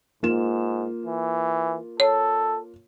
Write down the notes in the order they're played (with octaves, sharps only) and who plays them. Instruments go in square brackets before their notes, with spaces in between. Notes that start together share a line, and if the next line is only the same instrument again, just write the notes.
[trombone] G#2 [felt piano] A#3 F4 E7
[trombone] E3
[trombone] A4 [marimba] C#5